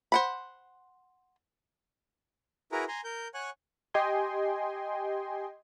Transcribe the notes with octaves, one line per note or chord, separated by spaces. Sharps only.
C5 F#5 B5
E4 F#4 G#4 A#4 B4 A#5
G#5 A#5 C6
A#4 G6
C#5 F#5 G#5 C#6 F#6
G4 D#5 G5 G#5 C6